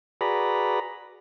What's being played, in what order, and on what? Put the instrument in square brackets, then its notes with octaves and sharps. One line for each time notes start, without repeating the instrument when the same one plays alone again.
[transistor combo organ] F#4 G#4 B4 D5 A#5 B5